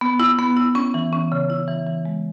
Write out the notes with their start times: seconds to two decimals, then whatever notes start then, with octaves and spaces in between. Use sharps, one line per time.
0.01 B3
0.20 E4
0.39 B3
0.57 E4
0.75 C#4
0.94 E3
1.13 C#4
1.32 C#3
1.50 E4
1.68 E3
1.86 E3
2.05 G#3